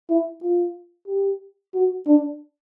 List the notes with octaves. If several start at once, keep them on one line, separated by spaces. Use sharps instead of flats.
E4
F4
G4
F#4
D4